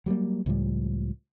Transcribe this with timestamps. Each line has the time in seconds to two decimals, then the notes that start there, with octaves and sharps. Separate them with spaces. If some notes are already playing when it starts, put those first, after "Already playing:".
0.06 F#3 G3 A3 A#3
0.46 C#2 A2 F3 G3